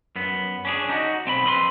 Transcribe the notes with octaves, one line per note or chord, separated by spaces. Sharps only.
F#2 B3
C#4 D4 G#4
D#4 F#4
B1 C4 G5 B5
F2 C4 B4 D5 C6